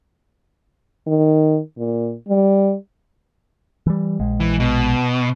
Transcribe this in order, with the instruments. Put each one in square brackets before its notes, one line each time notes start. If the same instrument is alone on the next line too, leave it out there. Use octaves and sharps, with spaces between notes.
[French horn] D#3
A#2
G3
[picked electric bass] E3 G3
A#1 G#3
[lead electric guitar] E3
B2